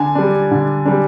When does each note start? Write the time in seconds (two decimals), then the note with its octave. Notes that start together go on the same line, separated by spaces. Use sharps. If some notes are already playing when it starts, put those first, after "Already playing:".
Already playing: D3 G#5
0.15 G3 D4
0.51 D3
0.86 G3 D4